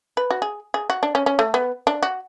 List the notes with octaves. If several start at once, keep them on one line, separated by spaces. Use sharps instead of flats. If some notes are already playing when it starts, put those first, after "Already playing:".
B4
F#4
G#4
G#4
F#4
D4
C#4
C#4
A3
B3
D4
F#4